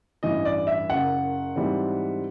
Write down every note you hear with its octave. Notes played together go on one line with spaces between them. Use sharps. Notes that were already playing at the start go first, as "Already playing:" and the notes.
A1 G2 E3 D#5
D5
E5
F#1 F#2 C#3 F#5
G#2 E3 G3 C4